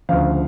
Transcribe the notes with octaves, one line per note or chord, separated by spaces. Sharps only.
D2 C#3 F3 F5